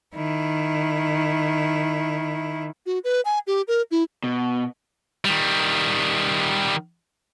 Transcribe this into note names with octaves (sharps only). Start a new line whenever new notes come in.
D#3 E4
F#4
B4
G#5
G4
A#4
E4
B2
D#3 G3